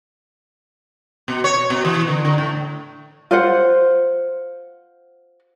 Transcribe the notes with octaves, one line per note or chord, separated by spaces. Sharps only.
B2
C#5
B2
E3
D3
D3
A2
F4 C5 F#5